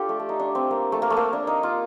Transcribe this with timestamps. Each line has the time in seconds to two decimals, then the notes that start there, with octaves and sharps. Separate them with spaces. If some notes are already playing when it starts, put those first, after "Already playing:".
Already playing: D4 F4 G4 A4
0.09 A3
0.19 A3
0.29 D#4
0.39 D4
0.55 C4
0.71 A#3
0.92 A3
1.02 A#3
1.10 A3
1.17 A#3
1.33 D4
1.47 D#4
1.63 F4